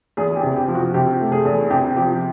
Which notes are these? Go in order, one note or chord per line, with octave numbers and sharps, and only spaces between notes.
E2 G#4
G4
C3
G4
F3
F#4
C3 G4
A3
G#4
E2
C3 G4
F3 G4